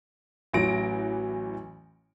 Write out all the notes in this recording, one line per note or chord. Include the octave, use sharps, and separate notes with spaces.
A1 E3 F#3 A#6 D7